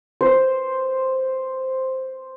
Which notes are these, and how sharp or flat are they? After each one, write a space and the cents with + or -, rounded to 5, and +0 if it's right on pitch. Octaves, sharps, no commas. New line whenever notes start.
C5 +0